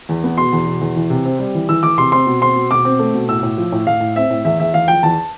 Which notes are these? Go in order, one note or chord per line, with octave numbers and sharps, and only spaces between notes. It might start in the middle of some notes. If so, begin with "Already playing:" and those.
E2
B3
B2 C6
E2
B2
E2
E3
C3
C4
G3
E3
E3 E6
E3 D6
C3 C6
C4 C6
B2
C4 C6
B2
B2 D6
C4
A3
B2
A2 E6
A2
F3
A2
A2 F5
A2
C4 E5
A2
E2 E5
E2 E5
E2 F5
F3 G5
E2 A5